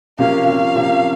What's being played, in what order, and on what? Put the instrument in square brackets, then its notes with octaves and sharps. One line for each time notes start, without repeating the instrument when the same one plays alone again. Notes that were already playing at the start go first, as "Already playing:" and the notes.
[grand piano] C3 F3 A#3 C#4 [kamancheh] F5
[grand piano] C3 F3 A#3 C#4 [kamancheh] F5
[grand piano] C3 F3 A#3 C#4